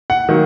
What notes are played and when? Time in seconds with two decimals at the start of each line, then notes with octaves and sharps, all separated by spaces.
0.10 F#5
0.29 D#3 F#3 A#3